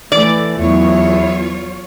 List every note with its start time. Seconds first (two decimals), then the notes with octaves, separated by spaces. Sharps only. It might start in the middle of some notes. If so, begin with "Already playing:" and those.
0.12 E3 A3 D5
0.60 E2 F#3 E4 F4 C#5